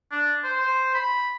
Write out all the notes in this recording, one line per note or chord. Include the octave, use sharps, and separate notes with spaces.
D4
C5
C5
B5